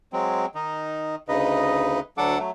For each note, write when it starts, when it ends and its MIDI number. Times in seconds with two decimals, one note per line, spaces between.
0.13 0.46 54
0.13 0.46 56
0.13 0.46 60
0.55 1.15 51
0.55 1.15 63
1.29 2.00 38
1.29 2.00 49
1.29 2.00 63
1.29 2.00 71
1.29 2.00 75
2.18 2.38 38
2.18 2.38 54
2.18 2.38 62
2.18 2.38 69
2.18 2.38 78
2.18 2.38 86
2.38 2.51 54
2.38 2.51 57